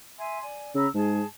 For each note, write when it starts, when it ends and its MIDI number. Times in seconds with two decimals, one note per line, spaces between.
0.17 0.41 76
0.17 0.41 80
0.17 0.41 84
0.42 0.70 74
0.42 0.70 80
0.75 0.87 49
0.75 0.87 82
0.75 0.87 83
0.75 0.87 88
0.94 1.22 44
0.94 1.25 68
0.94 1.25 81